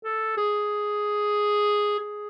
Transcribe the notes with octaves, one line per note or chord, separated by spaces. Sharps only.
A4
G#4
G#4